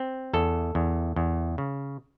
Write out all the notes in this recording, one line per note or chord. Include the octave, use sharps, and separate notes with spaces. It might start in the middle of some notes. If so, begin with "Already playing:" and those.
Already playing: C4
E2 A4
E2
E2
C#3